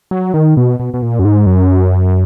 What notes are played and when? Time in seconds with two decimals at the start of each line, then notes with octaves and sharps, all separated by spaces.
0.11 F#3
0.34 D#3
0.57 B2
0.80 B2
0.94 B2
1.02 A#2
1.19 F#2
1.25 G#2
1.46 F#2